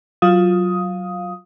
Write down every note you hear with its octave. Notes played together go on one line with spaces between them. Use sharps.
F#3 F4 F5 D#6